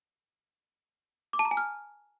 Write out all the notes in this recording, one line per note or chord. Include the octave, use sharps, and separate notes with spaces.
D6
A5
A#5
G#5
F6